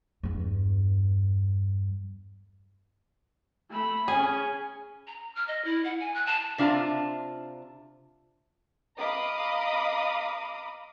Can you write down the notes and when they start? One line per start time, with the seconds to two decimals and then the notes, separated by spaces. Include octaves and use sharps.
0.23 E2 G2
3.70 A3 B5
4.08 C#4 G#4
5.07 A#5
5.35 F6
5.48 D#5
5.65 E4
5.84 F#5
6.00 G#5
6.14 F#6
6.26 A5
6.58 C3 D4 F4 A5 A#5
8.98 D#5 F5 A#5 B5 D6 D#6